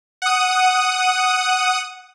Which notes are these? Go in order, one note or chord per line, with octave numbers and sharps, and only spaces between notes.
F#5 D#6